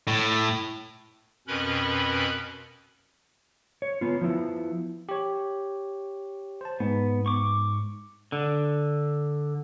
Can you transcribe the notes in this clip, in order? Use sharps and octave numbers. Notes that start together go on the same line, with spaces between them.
A2
F2 B2 C#4 A#4 B4 B5
C#5
B3 F4
F3 B3 E4
G4 C#5
C5 A5
G#2 B3
C#6 D6
D3